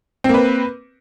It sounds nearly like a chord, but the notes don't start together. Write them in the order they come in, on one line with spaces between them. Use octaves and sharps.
C4 A#3 B4